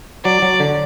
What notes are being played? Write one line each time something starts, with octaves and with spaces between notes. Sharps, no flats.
F#3 D5
F#3
D3